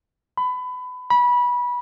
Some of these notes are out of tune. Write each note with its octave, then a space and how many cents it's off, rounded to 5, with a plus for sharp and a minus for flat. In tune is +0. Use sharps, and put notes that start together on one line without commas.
B5 +25
B5 -20